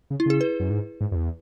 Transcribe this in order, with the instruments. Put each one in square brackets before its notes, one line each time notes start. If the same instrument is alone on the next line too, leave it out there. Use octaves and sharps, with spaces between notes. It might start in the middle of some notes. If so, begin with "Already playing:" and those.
[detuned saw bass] C#3
[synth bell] E4
[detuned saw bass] C#3 [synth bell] G#4
[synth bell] B4
[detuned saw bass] F#2
G#2
G#2
F#2
E2